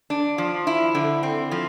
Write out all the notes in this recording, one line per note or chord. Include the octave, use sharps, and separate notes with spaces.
D4
F3
E4
D3
C4
F3